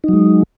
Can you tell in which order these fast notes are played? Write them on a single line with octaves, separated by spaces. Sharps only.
D#4 F#3 G#3